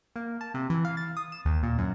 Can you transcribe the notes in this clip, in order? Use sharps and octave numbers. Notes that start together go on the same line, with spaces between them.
A#3
A5
C3
E3
F5
A6
D#6
E7
D#2
A#2
F#2